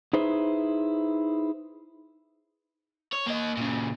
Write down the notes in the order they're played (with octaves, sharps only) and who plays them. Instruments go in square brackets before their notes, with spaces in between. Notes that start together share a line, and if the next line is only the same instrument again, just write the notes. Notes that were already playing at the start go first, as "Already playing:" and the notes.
[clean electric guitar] D#4 E4 G#4 B4 C5
[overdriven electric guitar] C#5
A#3 D#5
A#2 C#3